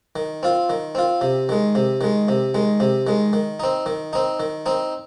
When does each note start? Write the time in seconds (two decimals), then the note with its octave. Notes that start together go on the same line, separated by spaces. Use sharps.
0.16 D#3
0.43 C4 F4
0.70 D#3
0.95 C4 F4
1.21 C3
1.49 D#3 G#3
1.75 C3
2.01 D#3 G#3
2.28 C3
2.54 D#3 G#3
2.80 C3
3.07 D#3 G#3
3.33 D#3
3.60 C4 D#4
3.86 D#3
4.13 C4 D#4
4.40 D#3
4.66 C4 D#4